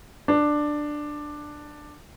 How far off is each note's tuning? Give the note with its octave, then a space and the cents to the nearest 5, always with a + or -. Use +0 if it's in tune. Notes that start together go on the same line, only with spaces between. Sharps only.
D4 +10